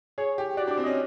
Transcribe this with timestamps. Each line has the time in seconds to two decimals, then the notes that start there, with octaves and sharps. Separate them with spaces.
0.18 G#4 C#5
0.38 G4
0.57 F#4 D5
0.67 D4
0.71 D5
0.77 C4
0.84 C#4 D#5